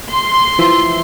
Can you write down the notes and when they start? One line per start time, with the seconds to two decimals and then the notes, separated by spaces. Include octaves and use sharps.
0.11 C6
0.59 E3 F3 E5